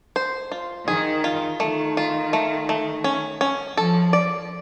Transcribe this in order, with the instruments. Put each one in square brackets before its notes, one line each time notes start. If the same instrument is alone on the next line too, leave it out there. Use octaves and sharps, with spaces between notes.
[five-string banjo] C5
F4
[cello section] D#3 [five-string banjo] G#4
[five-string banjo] F4
[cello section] D#3 [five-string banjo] A3
[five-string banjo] F4
A3
A3
C#4
C#4
[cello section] F3 [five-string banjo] A4
[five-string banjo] D5